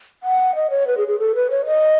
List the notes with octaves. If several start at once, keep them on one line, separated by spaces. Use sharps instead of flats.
F#5
D#5
C#5
B4
G#4
G#4
A4
B4
C#5
D#5